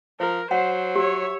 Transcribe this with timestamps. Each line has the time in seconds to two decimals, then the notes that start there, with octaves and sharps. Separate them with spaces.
0.20 F3 A#4 C5
0.51 F#3 C5 F#5
0.96 G4 C#5 E5